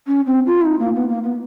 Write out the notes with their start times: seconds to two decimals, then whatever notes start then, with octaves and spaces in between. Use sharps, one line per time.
0.07 C#4
0.26 C4
0.46 F4
0.61 E4
0.66 D#4
0.79 A#3
0.95 B3
1.09 A#3
1.24 B3